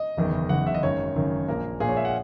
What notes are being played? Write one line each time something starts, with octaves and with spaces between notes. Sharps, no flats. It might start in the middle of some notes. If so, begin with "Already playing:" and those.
Already playing: D#5
F#1 E2 D#3
F#1 E2 D#3 F#5
E5
D#5
G#1 F#2 D#3 C#5
G#1 F#2 D#3
A#1 A#2 A#3 A#4
A#1 A#2 A#3 G#4
C#5
E5
F#5